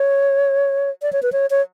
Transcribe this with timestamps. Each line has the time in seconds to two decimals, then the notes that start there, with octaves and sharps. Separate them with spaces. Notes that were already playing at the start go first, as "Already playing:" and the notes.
Already playing: C#5
1.02 D5
1.13 C#5
1.23 B4
1.32 C#5
1.50 C#5